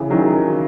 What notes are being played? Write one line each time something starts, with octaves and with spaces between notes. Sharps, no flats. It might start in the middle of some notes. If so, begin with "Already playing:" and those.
Already playing: C#3 E3
D#3 F#3